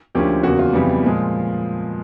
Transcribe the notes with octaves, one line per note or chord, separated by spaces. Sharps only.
D2 D3 F3 A#3 C#4 G4
E2 C#3 F#3 A#3 F#4
F4
F2 C#3 E3 G3 B3
A#2 F3 G#3